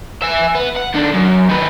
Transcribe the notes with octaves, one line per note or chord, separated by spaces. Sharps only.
E5 G#5
B3
F#5
D#3 D4
F#2
D#3 B4